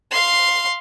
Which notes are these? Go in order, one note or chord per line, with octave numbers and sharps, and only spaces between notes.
F5 C6